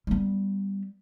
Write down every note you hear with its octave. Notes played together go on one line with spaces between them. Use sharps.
G3 B3